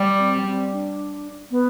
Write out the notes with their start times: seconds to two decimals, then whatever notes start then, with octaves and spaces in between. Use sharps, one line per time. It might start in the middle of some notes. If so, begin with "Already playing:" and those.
Already playing: G3
0.19 C4
0.46 C4
0.72 D4
1.51 B3